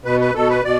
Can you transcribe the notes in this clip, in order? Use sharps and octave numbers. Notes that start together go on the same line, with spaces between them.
B2 B4
B4
B2 A4
B4
B2 D5